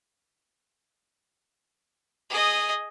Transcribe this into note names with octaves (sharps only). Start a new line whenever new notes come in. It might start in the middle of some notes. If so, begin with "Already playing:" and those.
G#4 D#5